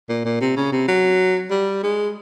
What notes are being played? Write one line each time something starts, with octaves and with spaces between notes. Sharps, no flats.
A#2
A#2
C3
C#3
C3
F#3
G3
G#3